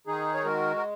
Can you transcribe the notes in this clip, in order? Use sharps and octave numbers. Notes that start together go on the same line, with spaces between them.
D#3 D#4 G#4
C#5
G#3 F#4 A#4
A#4